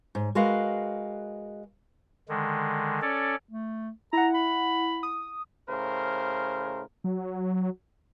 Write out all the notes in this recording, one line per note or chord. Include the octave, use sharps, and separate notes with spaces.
G#2
G#3 F#4 A#4 B4 D#5 F5
D3 D#3 G#3
C#4 A4 C#5 D5
A3
E4 F#5 A#5
B5
D#6
A2 C#3 A#4 C5
F#3